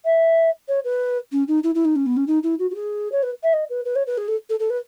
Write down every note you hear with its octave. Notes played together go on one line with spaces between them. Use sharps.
E5
C#5
B4
C#4
D#4
E4
E4
D#4
C#4
B3
C#4
D#4
E4
F#4
F#4
G#4
C#5
B4
E5
D#5
B4
B4
C#5
B4
G#4
A4
A4
A4
B4